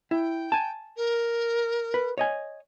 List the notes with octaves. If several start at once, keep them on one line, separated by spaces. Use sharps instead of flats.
E4 G5
G#5 A5
A#4
B4
C#5 D#5 G#5